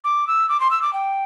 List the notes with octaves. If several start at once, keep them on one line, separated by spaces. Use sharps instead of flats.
D6
E6
D6
C6
E6
D6
G5